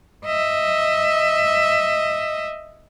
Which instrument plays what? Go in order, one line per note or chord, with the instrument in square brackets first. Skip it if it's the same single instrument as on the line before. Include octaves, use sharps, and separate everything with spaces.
[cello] D#5 E5